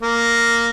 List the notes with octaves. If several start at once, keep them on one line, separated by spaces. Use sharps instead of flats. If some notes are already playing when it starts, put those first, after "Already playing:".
A#3